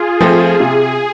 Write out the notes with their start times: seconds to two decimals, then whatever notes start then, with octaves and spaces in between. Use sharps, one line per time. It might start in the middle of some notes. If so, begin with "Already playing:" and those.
Already playing: F4 G#4
0.21 F3 A3 C4
0.60 C3 G#4